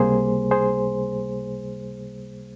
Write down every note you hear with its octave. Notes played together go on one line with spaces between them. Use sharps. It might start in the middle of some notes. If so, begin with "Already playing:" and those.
Already playing: C#2 C3 G3 A#3 G#4 C5
G#4 C5